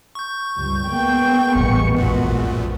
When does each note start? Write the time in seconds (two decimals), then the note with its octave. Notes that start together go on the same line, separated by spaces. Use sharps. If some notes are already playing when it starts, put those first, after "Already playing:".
0.15 C#6 G6
0.56 C#2 G2 G3
0.87 G#3 A#3 B3 G5
1.55 D#1 A1 C#6
1.97 A#1 F#2 A#2 F#4